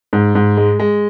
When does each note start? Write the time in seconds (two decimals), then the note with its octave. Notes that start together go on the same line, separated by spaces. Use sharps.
0.13 G#2
0.35 G#2
0.57 G#3
0.79 G#3